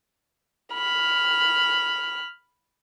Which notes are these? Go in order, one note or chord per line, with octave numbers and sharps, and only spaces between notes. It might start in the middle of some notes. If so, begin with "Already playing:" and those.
B5 F6